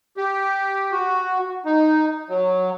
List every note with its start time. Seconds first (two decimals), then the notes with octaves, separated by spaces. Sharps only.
0.17 G4
0.92 F#4
1.65 D#4
2.29 F#3